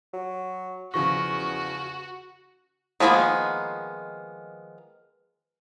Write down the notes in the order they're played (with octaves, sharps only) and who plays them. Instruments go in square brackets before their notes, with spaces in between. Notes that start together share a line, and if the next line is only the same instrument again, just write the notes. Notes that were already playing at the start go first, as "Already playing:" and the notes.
[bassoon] F#3
[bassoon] E2 [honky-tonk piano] C#3 F3 A#6 [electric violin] F#4 [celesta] C#6
[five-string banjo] D#3 F3 G#3 A#3 B3